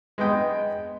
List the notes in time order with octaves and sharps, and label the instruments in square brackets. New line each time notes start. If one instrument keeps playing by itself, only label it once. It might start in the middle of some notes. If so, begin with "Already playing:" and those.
[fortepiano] G#3 B3 D#5 G5